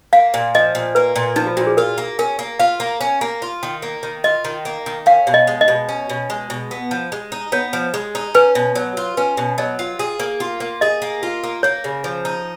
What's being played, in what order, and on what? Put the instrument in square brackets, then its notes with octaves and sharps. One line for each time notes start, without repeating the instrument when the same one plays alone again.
[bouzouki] A#3 [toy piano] F5
[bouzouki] A#2
[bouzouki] F3 [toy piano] D#5
[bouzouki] A#2
[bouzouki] A#3 [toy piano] B4
[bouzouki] A#2
[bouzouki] F3 [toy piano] D#4
[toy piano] F4
[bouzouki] A#2 [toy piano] F#4
[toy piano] G#4
[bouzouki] F4 [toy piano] A#4
[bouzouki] A#3
[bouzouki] C#4 [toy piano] A#4
[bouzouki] A#3
[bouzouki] F4 [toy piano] F5
[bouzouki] A#3
C#4
A#3
F4
D#3
A#3
D#3
[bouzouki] F4 [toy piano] D#5
[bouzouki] D#3
A#3
D#3
[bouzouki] C#4 [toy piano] F5
[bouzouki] B2
[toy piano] D#5
[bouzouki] G#3
[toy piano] D#5
[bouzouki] B2
C#4
B2
G#3
B2
B3
F3
G#3
D#4
[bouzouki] B3 [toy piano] C#5
[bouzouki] F3
G#3
D#4
[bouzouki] C#4 [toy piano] B4
[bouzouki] B2
F#3
F4
[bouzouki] C#4 [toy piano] B4
[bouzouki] B2
[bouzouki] F#3 [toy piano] D#5
[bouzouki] F4
G#4
A#3
F4
A#3
[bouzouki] G#4 [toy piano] D#5
[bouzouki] A#3
F4
A#3
[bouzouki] A#3 [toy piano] C#5
[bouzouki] C#3
F3
D#4